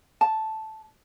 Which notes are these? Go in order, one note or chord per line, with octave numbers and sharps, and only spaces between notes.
A5